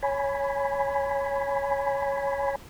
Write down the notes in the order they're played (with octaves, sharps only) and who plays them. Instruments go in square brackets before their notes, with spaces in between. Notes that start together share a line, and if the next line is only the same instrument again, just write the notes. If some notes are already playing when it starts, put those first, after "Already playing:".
[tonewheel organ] C#5 G#5 B5